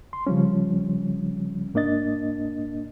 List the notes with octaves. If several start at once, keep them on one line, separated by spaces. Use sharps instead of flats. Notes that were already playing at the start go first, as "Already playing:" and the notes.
C6
C#3 F3 G3 C#4
G#2 A#3 D4 D#5 A6